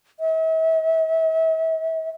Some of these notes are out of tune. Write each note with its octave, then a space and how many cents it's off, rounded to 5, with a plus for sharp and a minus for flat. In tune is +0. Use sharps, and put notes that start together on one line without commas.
E5 -40